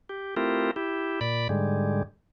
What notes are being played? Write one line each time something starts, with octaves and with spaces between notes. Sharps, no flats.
G4
A3 C4 E4 F4 G4 A#4
E4 G4
A#2 D5 B5
G#2 D3 G3 G#3